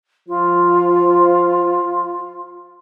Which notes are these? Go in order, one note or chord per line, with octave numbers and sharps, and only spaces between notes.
F3 F4